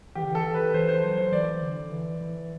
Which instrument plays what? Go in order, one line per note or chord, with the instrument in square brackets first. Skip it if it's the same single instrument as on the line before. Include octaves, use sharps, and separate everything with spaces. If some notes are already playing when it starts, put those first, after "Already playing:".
[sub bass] E3 [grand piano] G4
[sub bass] D3
E3
[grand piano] A4
B4
[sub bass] E3 [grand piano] C5
[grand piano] C5
[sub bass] F#3 [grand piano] C5
[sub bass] F#3 [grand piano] C5
[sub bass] E3 [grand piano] D5
[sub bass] D3
E3
E3